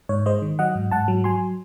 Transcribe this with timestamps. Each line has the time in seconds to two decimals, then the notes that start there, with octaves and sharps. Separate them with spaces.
0.09 G#2 C#5
0.26 G#3 C5 D#5
0.42 D#3
0.59 F#3 D#5 F#5
0.75 G#2
0.91 G#2 F#5 A5
1.08 F#3
1.24 F#3 G#5 C6